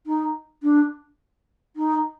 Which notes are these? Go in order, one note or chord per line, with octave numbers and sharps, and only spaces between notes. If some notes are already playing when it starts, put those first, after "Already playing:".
D#4
D4
D#4